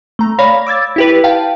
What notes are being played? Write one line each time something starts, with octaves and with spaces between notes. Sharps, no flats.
A3 A#5
C#5 D5 F5 B5 A#6
D6 E6 G#6 A6
E4 G4 B4
F5 G5 A5